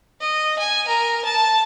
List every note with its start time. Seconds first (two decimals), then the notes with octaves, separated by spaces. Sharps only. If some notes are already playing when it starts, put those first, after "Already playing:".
0.21 D#5
0.59 G#5
0.88 A#4
1.25 A5